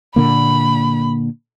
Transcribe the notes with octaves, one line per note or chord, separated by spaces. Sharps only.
A#2 D3 A#3 B5